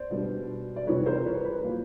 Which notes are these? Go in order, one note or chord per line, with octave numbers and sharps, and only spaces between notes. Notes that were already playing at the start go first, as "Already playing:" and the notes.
Already playing: C5 D5
B2 G3 B3 D4
D5
F2 C3 E3 G3 C4 B4 C#5
A#4 C5
B4 C#5
B4
A#2 F#3 A#3